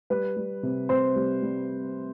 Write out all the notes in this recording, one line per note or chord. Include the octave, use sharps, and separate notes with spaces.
G3 B4
G3
C3
C3 C5
G3
G3